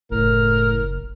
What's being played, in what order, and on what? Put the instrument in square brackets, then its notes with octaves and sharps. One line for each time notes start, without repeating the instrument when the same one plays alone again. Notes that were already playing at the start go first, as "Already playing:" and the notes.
[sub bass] F#1 [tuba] A2 [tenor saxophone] A#4